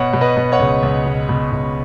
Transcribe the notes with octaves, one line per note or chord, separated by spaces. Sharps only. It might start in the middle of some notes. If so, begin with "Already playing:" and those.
Already playing: B2 C#5 F#5
B2
B4 D#5
B2
C#5 F#5
C#2
C#2
B2
B2
C#2